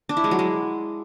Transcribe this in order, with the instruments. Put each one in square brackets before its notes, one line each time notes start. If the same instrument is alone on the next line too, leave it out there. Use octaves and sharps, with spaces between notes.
[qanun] D4
E4
G#3
F#3
G#3